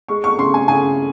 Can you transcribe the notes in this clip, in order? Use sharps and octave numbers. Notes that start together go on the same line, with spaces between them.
G#3 C#6
C#6
C#3 C6
G#5
C#3 G#5